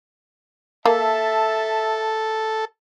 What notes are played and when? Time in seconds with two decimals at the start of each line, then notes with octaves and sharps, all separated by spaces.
0.86 A#3 A4 E5 A5